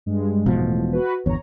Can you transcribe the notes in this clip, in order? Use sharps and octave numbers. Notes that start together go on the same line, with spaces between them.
G2 G#3
E1 G#2 B2 F3
A2
F#4 B4
G1 E2 C#5 A#5